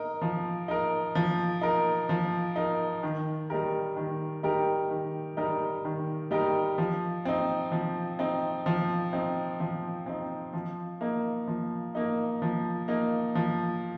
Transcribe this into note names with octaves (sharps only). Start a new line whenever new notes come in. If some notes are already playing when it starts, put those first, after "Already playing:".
Already playing: D#4 A#4
F3
D#4 A#4
F3
D#4 A#4
F3
D#4 A#4
D#3
G3 D#4 G4 A#4
D#3
G3 D#4 G4 A#4
D#3
G3 D#4 G4 A#4
D#3
G3 D#4 G4 A#4
F3
C4 D#4
F3
C4 D#4
F3
C4 D#4
F3
C4 D#4
F3
A#3 D#4
F3
A#3 D#4
F3
A#3 D#4
F3